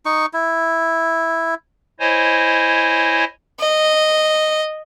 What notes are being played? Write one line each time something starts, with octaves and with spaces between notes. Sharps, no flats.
D#4 C#6
E4
E4 C5 C#5 D#5 G#5
D#5